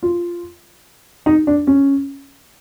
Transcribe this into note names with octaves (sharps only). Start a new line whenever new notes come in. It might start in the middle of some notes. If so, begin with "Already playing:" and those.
F4
D#4
D4
C#4